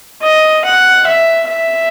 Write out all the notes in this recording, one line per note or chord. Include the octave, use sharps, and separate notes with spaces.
D#5
F#5
E5
E5